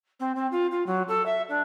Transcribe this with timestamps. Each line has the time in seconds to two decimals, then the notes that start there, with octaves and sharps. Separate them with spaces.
0.20 C4
0.36 C4
0.51 F4
0.71 F4
0.86 F#3
1.08 A4
1.26 E5
1.49 D4